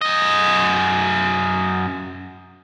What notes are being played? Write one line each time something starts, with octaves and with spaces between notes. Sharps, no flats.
F#2 D#5